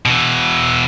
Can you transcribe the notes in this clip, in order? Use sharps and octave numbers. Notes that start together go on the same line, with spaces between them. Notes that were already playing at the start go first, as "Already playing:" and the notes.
B2 E3